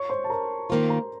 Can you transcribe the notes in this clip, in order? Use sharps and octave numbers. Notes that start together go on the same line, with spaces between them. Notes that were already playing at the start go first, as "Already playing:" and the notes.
Already playing: C#5 C#6
C5 C6
A5
A#4 A#5
D#3 A#3 F4 C5 C6
A#4 A#5